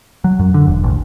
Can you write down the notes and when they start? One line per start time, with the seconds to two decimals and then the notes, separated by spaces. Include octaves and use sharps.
0.24 F#3
0.39 F#2
0.54 D3
0.68 E1
0.84 A1